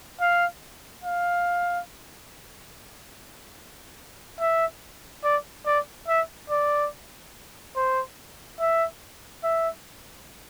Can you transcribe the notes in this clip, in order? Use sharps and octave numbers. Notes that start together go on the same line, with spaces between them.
F5
F5
E5
D5
D5
E5
D5
C5
E5
E5